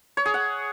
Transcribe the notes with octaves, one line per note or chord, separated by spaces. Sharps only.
C#5
G#4
F#5